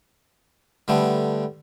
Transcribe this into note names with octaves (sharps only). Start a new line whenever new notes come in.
D3 G3 A3 B3